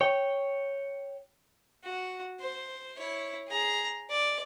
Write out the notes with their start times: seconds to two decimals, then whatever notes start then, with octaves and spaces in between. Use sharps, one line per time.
0.01 C#5 G5
1.84 F#4
2.40 C5
2.98 E4 C#5
3.48 G#4 A#5
4.10 D5